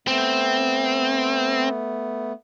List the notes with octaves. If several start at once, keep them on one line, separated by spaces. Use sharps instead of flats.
A3 B3 C4